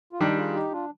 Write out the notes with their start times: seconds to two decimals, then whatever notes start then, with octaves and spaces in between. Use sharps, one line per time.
0.13 F4
0.20 D#3 G3 D4 D#4 G4
0.30 G4
0.37 F4 G#4
0.54 D#4 G4
0.72 D4 F4